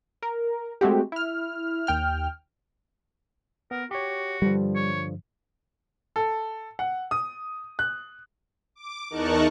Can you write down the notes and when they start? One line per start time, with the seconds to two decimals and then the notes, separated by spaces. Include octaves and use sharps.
0.22 A#4
0.81 G#3 A3 C4 F#4 G4
1.12 E4 F6
1.87 D#2 G5 F6
3.71 B3 A#4
3.91 F#4 G4 C#5
4.42 G2 D3 F3 G3
4.75 C#5
6.16 A4
6.79 F#5
7.11 D#6
7.79 F#6
8.75 D6
9.10 E2 D#4 A#4 A5 C#6 F#6